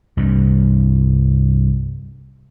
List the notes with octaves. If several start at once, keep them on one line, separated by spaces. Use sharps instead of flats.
C2 G2